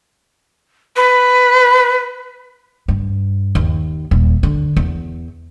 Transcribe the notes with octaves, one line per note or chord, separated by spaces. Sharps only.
B4
G2
D#2
D#1
D3
E2